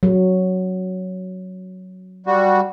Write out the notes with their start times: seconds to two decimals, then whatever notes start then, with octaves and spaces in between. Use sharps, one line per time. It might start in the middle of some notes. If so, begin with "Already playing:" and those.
0.03 F#3
2.26 G3 F#4